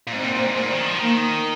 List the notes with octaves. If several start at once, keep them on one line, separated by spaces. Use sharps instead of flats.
A#2
G#2 C4
A#2
A#2
G#2
A#2
D#3
F3
D#3 A#3